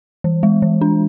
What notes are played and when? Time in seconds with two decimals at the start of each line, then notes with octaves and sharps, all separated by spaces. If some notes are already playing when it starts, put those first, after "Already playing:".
0.24 E3
0.43 G#3
0.62 E3
0.81 D4